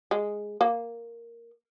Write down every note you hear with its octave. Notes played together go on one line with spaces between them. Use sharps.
G#3
A#3